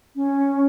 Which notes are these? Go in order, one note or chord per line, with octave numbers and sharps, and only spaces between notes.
C#4